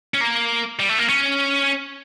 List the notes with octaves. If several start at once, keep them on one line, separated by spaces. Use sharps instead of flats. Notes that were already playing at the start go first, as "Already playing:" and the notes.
C#4
A#3
G3
A3
A#3
C#4